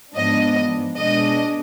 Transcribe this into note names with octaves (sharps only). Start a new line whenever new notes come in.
G#2 F3 B3 D4 D#5
B2 G#3 D4 D#5